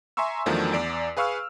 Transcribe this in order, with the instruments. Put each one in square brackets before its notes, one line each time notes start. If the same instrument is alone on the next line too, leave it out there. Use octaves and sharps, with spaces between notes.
[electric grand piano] E5 G#5 A#5 C6 C#6 E6
E2 D#3 F3 F#3 A3 D4
E2 D5 D7
G#4 B4 F5 C#6 E6 F6